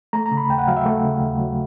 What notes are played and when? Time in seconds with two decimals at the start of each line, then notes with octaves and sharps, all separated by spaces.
0.13 A3 A#5
0.26 A#5
0.31 C#3
0.37 B5
0.49 D#2 G5
0.58 F#5
0.68 F#3 F5
0.77 E5
0.86 A3
1.04 C#3
1.21 D#2
1.39 F#3